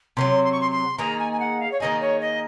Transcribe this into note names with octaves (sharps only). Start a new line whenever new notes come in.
C3 D#3 F#3 C6
C6
C#6
C6
C6
D#3 A#3 D#4 G#4 A#5
G#5
G#5
F#5
F5
C#5
D#3 A#3 D#4 G#4 D#5
C#5
D#5